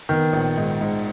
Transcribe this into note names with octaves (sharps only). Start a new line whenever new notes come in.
D#3 B3
A#1
G#2
G#2